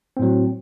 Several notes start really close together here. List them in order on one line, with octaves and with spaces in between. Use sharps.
C4 A2 F#3